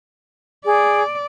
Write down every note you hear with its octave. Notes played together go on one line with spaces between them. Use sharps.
G#4 D5